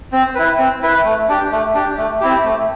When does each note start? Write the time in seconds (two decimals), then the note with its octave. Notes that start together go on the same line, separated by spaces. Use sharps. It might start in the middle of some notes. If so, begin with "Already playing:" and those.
0.12 C4
0.35 E4 B4
0.58 C4
0.82 E4 B4
1.04 A3
1.28 D4 G4
1.52 A3
1.74 D4 G4
1.97 A3
2.21 C4 E4 G4
2.44 A3